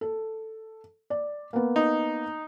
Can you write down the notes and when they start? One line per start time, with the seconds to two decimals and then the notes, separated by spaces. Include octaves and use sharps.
0.01 A4
1.10 D5
1.53 A#3 B3
1.76 D#4